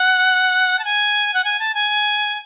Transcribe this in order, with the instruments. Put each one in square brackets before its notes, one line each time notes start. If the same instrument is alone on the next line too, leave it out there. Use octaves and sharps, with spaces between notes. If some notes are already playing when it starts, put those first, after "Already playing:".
Already playing: [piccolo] F#5
A5
G#5
F#5
G#5
A5
G#5